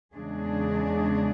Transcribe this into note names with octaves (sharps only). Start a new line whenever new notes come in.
E2 C#3 G#3 D4 G#4